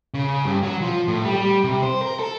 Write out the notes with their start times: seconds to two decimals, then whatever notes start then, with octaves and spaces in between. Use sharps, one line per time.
0.14 C#3
0.45 G2
0.63 F#3
0.82 F3
1.08 A2
1.25 G3
1.36 G3
1.64 C3
1.82 C5
2.02 A#4
2.19 A4